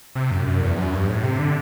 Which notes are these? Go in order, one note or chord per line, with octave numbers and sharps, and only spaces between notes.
C3
F#2
F#2
E2
F#2
G2
A2
C3
D3